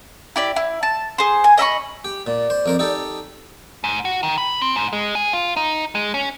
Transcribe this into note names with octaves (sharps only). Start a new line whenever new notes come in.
E4 G4 D5
E4
A5
G#4 C5
G#5
D#5 E5 B5 C#6
G4
A#2 D5
C5
F2 A#4 C5
D#4 G4 A4
G#2
F#4
D#3
B5
C4
G#2
G#3
G#4
F4
D#4
G#3
C#4